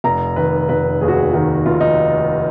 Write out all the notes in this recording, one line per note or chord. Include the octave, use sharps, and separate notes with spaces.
F1 A#5
D#3 B4
F1 B4
D#2 G#4
F#4
G#4
D#3 F#4
F1 F4
D#4